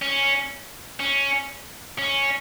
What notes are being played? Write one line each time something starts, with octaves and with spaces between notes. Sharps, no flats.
C#4
C#4
C#4